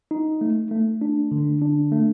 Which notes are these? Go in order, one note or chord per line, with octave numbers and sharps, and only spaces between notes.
D#4
A3
A3
D4
D3
D4
A3